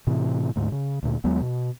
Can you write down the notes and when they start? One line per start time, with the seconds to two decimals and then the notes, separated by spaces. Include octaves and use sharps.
0.07 A2 C3 E3
0.56 D2 G#2
0.72 C#3
1.03 D2 A#2
1.24 D#2 F#3 G#3 B3
1.41 B2